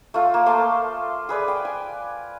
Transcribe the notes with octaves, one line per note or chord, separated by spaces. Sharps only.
A3 F4
A#3
A3 A5 C6
G#4 B4 D5
G5
G#5